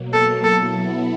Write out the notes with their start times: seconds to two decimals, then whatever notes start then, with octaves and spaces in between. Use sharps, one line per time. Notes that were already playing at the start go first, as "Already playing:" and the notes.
Already playing: B2 F#3 A#3
0.13 A4
0.44 F#3 B3 E4 A4